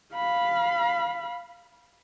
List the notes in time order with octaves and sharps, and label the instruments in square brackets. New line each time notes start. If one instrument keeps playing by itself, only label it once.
[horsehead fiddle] F5 B5